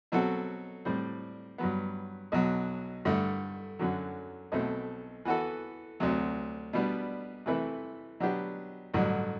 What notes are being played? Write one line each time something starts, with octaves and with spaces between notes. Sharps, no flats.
B2 F#3 C4 F#4 A4
A2 G3 C4
G2 F#3 B3
B1 B2 F#3
G2 D3 A3
F#2 D3 F#3
B1 B2 A3 C4
E3 B3 F#4 A4
D2 C3 F#3
B2 G3 B3 D4
C3 E3 A3 E4 B4
B2 F#3 B3 D4 G4
A1 G2 D3 F#3